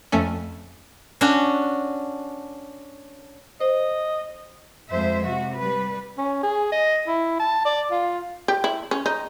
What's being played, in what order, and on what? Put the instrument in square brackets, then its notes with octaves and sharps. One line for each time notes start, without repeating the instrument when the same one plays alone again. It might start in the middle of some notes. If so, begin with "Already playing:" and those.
[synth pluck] F2 A3 C#4
[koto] C#4 D4 F#4
[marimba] C5 [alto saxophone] D#5
[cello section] F2 G#3 C5 E5
C3 F#4
G3 B4
[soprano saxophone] C#4
G#4
D#5
E4
A5
D5
F4
[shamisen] G4
E4
C#4
D#4